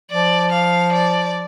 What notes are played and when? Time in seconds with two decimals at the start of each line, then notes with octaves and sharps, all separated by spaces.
0.11 F3 D5
0.52 F5
0.93 D5